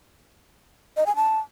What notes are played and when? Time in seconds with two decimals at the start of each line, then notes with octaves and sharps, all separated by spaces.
0.97 D#5
1.06 G#5
1.16 A5